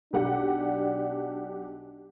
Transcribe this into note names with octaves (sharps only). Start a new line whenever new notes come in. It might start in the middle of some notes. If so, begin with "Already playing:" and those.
B1 D4 G4 F#5